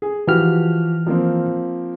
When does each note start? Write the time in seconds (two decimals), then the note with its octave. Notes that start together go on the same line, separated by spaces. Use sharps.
0.02 G#4
0.28 E3 F3 F#4 G4 F6
1.07 F3 A#3 C4